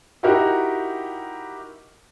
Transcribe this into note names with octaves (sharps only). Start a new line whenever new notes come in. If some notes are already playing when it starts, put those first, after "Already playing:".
D#4 E4 F#4 G4 A#4